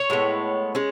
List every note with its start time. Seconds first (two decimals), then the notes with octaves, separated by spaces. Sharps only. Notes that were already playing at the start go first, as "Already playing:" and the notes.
Already playing: C#5
0.10 A2 G#3 B3
0.75 G#3 C#4